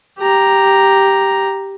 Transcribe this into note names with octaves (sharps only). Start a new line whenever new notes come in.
G4 A#5